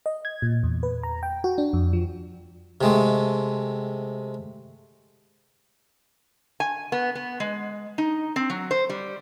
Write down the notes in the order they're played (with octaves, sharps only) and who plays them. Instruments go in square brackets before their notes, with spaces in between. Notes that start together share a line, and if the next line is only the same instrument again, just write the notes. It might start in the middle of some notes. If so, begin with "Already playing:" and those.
[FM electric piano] D#5
G#6
A#2
E2
B4
A#5
G5
F#4
D4
F2
F3
[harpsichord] C3 G#3 A3
[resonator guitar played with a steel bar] G#5
B3
B3
G#3
D#4
C4
F#3
C5
G3